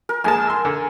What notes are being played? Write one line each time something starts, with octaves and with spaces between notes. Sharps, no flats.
A#4
A#1 G#3 G#5 A5
C6 E6
D3